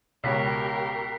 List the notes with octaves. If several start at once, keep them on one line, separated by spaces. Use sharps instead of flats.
C#2 B2 G4 A#4 C#5 B6 C7